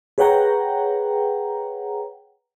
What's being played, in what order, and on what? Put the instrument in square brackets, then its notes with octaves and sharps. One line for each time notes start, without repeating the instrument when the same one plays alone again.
[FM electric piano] G#4 B4 C#5 F#5 G5 A#5